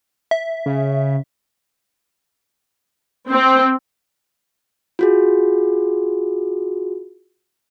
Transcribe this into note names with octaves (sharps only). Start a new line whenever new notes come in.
E5
C#3
C4
F4 F#4 G#4